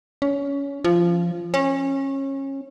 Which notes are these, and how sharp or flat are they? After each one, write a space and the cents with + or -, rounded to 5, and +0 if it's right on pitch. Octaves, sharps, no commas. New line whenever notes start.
C#4 +20
F3 -15
C#4 -25